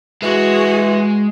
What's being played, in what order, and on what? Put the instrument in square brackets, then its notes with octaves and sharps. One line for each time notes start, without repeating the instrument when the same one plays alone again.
[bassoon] E3 [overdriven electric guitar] G#3 [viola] F#4 G#4